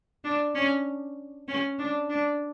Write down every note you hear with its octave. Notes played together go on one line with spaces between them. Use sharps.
D4
C#4
C#4
D4
D4